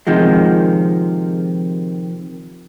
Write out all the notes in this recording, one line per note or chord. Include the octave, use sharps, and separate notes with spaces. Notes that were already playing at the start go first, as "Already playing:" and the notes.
C3 D#3 F3 G#3